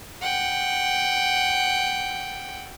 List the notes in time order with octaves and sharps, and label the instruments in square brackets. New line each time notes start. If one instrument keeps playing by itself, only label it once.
[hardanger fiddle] F#5 G5